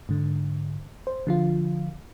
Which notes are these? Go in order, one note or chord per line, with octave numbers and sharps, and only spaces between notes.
G#2 D3
C5
D3 F3 F4